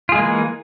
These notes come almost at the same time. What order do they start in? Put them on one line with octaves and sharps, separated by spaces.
F4 G#4 G#3 A#3 E3